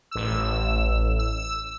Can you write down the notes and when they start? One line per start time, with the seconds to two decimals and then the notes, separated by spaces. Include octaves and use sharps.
0.11 A1 E6
1.19 E6